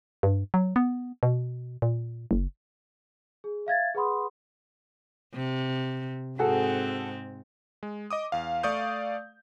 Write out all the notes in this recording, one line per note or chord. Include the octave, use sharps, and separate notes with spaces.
G2
F#3
B3
B2
A#2
F#1
G#4
E5 F5 G#6 A6
G#4 B4 F#5 B5 C6 D#6
C3
G#2 C4 F#4 G#4 A4
G#3
D#5 D6 D#6
E2 F5
A3 D5 F5 C#6 D#6 G6